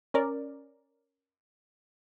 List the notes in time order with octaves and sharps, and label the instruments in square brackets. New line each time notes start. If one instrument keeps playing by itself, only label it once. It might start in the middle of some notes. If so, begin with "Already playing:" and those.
[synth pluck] C#4 A#4 D5